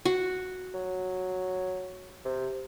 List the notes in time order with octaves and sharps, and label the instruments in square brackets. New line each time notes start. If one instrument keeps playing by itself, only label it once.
[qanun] F#4
[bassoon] F#3
C3